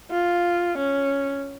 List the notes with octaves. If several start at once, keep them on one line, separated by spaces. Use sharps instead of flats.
F4
C#4